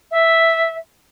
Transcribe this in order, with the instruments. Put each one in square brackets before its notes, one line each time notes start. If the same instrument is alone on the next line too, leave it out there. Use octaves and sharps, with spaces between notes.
[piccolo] E5